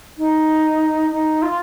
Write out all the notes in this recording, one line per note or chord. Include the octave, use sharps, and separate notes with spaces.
D#4
D#4
F4